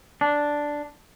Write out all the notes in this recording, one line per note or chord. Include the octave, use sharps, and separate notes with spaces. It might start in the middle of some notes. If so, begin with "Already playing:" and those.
D4